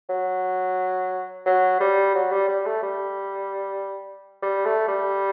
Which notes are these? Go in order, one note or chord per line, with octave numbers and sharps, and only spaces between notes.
F#3
F#3
G3
F#3
G3
G3
A3
G3
G3
A3
G3